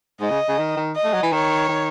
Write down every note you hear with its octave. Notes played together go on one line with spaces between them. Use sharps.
G#2 D#5
C#3
C#3
D#3
D#3
D#5
A3
F#3
E3
D#3 C#5
D#3